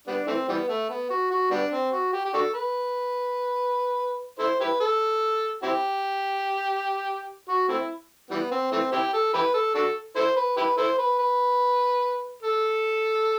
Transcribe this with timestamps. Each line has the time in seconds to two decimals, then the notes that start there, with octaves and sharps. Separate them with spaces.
0.07 G3 B3 D4
0.27 E3 A3 C4
0.49 E3 G3 B3
0.69 A3
0.89 B3
1.10 F#4
1.31 F#4
1.51 G3 B3 D4
1.71 C4
1.92 F#4
2.13 G4
2.25 G4
2.34 D4 F#4 A4
2.54 B4
4.39 E4 A4 C5
4.60 E4 G4 B4
4.80 A4
5.63 C4 E4 G4
7.48 F#4
7.69 A3 C4 E4
8.31 E3 G3 B3
8.51 C4
8.72 E3 A3 C4
8.92 C4 E4 G4
9.13 A4
9.34 E4 G4 B4
9.54 A4
9.75 D4 F#4 A4
10.16 E4 A4 C5
10.37 B4
10.57 E4 G4 B4
10.77 E4 A4 C5
10.99 B4
11.19 B4
12.43 A4